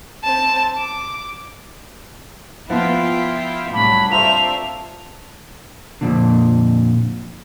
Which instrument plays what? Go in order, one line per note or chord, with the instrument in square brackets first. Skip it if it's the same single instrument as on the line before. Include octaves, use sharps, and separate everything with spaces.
[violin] C4 A5
D6
[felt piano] F3 B3 [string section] E4 F4 G5 [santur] F#5
[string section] C2 A2 F#3 [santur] D4 [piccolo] B5
[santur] A3 C4 F4 [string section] C5 D5 E5 [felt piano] A#5 [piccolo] F7
[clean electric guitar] F2 A#2 D3